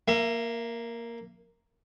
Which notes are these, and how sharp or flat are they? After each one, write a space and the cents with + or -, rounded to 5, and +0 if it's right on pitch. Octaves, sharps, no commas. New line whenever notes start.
A#3 +0 E5 +35